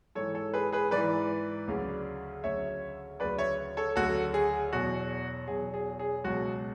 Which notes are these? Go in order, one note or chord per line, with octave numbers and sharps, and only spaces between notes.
G#2 E3 A4 C#5
A4 C#5
G#4 B4
G#4 B4
G#2 E3 B4 D5
D2 C#3 F#3
D2 C#3 F#3 C#5 E5
D2 C#3 F#3 B4 D5
C#5 E5
A4 C#5
D2 C#3 F#3 F#4 A4
G#4
E2 B2 F#3 F#4
E2 B2 F#3 G#4
G#4
G#4
C#2 B2 F#3 F#4